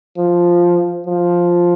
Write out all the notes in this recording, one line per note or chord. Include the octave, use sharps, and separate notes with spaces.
F3
F3